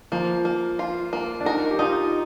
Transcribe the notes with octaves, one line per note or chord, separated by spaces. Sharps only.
F3 A#3
A#3
F4
A#3
D4
D#4 A#4
G4
D#4 F4